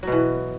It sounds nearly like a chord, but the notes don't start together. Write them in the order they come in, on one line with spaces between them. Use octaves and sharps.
F#3 B2 E3